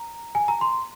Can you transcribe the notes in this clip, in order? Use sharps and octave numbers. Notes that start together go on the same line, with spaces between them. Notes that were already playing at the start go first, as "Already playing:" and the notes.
Already playing: A#5
G#5
A#5
C6